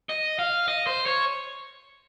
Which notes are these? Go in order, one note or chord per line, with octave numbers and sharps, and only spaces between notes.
D#5
F5
D#5
C5
C#5